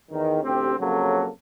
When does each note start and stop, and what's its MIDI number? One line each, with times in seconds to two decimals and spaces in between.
0.11 0.41 40
0.11 0.41 51
0.42 0.72 33
0.42 0.72 38
0.42 0.72 60
0.42 0.72 67
0.78 1.28 41
0.78 1.28 49
0.78 1.28 54
0.78 1.28 58
0.78 1.28 69